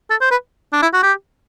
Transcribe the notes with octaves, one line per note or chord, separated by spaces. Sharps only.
A4
C5
B4
D4
E4
F#4
G4